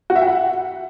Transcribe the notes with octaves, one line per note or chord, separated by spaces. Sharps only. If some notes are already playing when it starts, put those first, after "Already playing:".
F#4
E5
G5
F#5